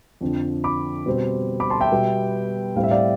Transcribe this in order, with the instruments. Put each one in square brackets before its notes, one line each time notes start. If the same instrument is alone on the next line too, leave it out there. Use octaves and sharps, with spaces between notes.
[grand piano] F2 D3 F3
B5 D6
B2 G3 C4
B5 D6
A5 C6
E5 G5
B2 G3 B3
A2 G3 C4 F5
E5
D5 F5